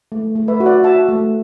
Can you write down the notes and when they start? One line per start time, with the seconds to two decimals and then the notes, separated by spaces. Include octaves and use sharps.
0.12 A3
0.35 A3
0.48 B4 E5
0.60 F#4
0.66 D5 F#5
0.84 F#4 E5 A5
1.09 A3